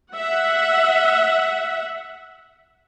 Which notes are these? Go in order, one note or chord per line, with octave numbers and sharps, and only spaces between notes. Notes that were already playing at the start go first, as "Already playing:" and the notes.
E5 F#5